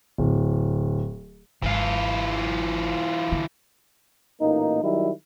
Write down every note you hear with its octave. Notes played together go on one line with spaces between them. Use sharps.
D1
G#1 E3 F4
D3
A1 A#2 A#3 D#4
D#3 F#3 G3 D#4 E4